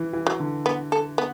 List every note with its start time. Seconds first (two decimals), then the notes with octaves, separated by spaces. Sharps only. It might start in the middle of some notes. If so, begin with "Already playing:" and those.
Already playing: E3
0.13 E3
0.27 F#3
0.40 D3
0.66 B3
0.92 A4
1.18 B3